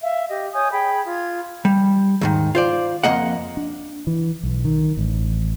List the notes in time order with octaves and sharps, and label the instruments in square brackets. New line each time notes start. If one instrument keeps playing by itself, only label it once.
[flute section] E5 F5
G4 D#5
C#5 G#5 D#6 G6
G#4 G5 B5
F4 G#6
[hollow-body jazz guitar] G3
D#2 G#2 D#3
F4 C5 D5
F2 A#3 D#5 F#5
[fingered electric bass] D4
E3
B1
D#3
A1